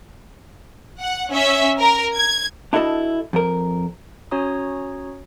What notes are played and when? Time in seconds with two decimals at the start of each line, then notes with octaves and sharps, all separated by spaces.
1.01 F#5
1.32 C#4 E5
1.79 A#4
2.16 G#6
2.73 D4 E4 F#4 A4 D#5 A5
3.33 F2 A#4
4.31 C#4 F#4 C#5 A#5 D#6